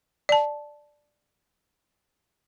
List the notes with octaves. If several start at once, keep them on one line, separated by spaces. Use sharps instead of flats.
D5 A5